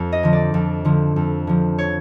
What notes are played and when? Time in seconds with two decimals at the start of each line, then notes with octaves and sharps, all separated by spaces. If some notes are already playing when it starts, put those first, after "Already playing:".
Already playing: F2
0.12 D#5
0.23 D3 F3
0.33 D5
0.54 F2
0.85 D3 F3
1.16 F2
1.47 D3 F3
1.78 C#5